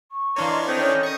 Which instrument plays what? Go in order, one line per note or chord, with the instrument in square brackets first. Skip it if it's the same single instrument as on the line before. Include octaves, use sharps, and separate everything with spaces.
[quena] C#6
[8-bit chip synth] E3 D4 C#5 [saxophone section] A#3 F4
[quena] D#5
[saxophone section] D3 D#3 [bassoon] C4 [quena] G6
[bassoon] C#4
[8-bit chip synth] C#6 D#6